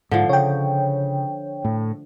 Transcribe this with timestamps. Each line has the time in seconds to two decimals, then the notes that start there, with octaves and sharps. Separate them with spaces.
0.11 G#2 D3 F3
0.29 C#3 C#5 G5
1.65 A2